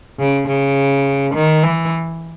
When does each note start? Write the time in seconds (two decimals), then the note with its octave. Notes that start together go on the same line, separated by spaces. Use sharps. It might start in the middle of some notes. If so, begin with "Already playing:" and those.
0.19 C#3
0.48 C#3
1.35 D#3
1.63 E3